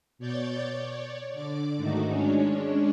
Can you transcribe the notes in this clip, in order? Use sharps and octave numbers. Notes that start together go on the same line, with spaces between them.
B2 C#5 D5 G6 A6
C#5 D5
D3 D5 D6
G#2 D#3 A3 D#4 F#4
G#3 C#4 D4 C#5